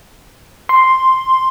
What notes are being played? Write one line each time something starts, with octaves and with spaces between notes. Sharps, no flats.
C6